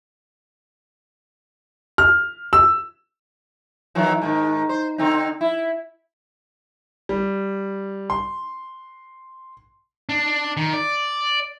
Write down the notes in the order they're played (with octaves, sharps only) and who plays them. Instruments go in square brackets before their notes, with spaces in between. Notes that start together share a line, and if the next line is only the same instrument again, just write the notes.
[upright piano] F6
E6
[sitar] D#3 E3 F#3
G#2 D#3
C5
D3 C4 D#4
E4
[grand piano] G3
C6
[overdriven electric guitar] D4
D#3
D5